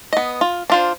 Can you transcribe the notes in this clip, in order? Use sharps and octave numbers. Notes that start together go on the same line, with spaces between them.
B3 D#5
F4
D4 F4 C5